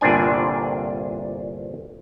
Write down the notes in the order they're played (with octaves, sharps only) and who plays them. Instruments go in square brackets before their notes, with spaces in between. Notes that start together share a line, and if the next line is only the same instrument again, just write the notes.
[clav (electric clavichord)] G1 C2 A#2 C4 D4 G#5